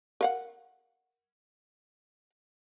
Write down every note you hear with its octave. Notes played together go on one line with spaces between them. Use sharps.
A#4 F5 F#5